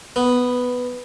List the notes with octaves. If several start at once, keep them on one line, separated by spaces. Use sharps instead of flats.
B3